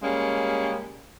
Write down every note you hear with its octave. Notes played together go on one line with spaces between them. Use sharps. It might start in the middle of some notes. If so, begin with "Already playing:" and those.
G3 G#3 A#3 C#4